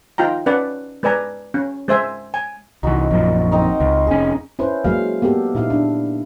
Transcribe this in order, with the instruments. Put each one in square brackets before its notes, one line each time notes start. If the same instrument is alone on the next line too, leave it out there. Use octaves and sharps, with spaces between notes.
[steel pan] D#4 F4 G5 A#5
C#4 B4 D5 F#5
G#3 B4 D5 G#5 A#5
C#4
G#3 C5 E5 G#5
G#5
[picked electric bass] C2 E3 [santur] D#4 F#4
[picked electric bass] A#1 F#2 A#2
[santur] C4 D#4 A#4
[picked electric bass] C#2
[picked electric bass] F1 C#4 [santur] G#4
[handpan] C#4 E4 B4 C5
F#3 G#3 A#3 F5
A#3 B3 G4 A4
A#2 D#4 E4 F5
D4